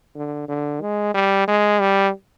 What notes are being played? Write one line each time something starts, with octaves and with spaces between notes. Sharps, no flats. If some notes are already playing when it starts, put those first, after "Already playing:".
D3
D3
G#3
G3
G#3
G3